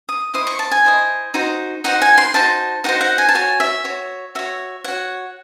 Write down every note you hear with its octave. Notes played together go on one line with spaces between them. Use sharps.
D#6
E4 C5 D#5 D#6
C#6
A5
G#5
E4 C5 D#5
D#4 F#4 C5
D#4 F#4 C5 F#5
G#5
C6
D#4 F#4 C5 A5
D#4 F#4 C5 F#5
F#5
G#5
A5
F#4 C#5 G#5
E5
F#4 C#5
F#4 C#5 E5
F#4 C#5 F#5